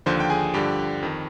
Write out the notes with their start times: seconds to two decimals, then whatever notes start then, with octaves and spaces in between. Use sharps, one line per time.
0.06 D#2 D3 F3 C5 C6
0.20 G5
0.30 G#4 G#5
0.54 G2 D3 F3 G4 G5
1.03 F2 D#3